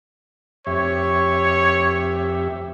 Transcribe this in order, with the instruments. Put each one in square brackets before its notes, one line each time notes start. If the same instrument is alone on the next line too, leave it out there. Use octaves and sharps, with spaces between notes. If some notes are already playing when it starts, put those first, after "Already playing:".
[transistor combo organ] F2 G4 E5 [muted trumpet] C#5